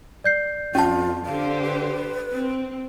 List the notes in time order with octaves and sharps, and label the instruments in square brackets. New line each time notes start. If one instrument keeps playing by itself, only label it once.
[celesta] D5 G6 C7
[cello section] F2 [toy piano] C#4 A5 [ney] F4
[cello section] D3 G4 C5 [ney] F5
[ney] B4
[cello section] C4